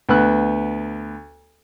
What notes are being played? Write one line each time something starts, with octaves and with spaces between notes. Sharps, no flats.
D2 B3 F#6